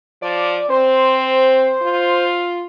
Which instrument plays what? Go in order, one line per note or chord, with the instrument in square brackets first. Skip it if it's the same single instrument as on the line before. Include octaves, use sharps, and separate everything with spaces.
[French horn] F3 [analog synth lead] D5
[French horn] C4 [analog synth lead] C5
[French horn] F4